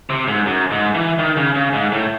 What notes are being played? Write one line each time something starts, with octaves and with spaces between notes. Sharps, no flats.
C3
G#2
F#2
G#2
E3
D#3
C#3
C#3
G#2
A2